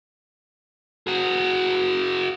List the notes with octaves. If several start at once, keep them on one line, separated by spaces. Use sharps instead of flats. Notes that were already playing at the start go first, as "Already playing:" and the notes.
F#4 G#4